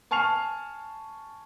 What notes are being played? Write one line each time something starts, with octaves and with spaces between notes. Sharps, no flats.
G#5 A5 C#6 F6 C7 F7